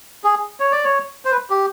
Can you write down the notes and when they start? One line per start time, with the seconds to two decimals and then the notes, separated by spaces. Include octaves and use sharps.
0.24 G#4
0.60 C#5
0.72 D5
0.84 C#5
1.25 C5
1.32 B4
1.50 G4